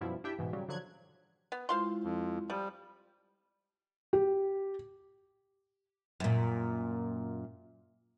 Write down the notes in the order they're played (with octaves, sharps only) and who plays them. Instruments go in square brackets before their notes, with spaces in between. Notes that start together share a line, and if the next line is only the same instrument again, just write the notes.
[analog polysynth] F#2 B2 F3 G3 E4
D4 E4 G4 E5 G5
G#2 B2 E3
C#3 F#3 G3
D3 F3 F#3 F#6 G#6
[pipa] B3
[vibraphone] G#3 E4 F4 [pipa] C5 F5 C6
[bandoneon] F2
[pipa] F3 [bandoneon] G3
[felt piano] G4
[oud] F#2 A#2